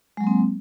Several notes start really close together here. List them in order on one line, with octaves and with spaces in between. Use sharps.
G#3 F#3 A#3 C4